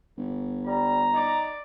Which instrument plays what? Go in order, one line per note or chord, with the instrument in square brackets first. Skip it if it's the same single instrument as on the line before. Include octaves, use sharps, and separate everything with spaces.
[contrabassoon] G1
[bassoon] G3 [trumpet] A#5
[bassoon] D#4 [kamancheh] D5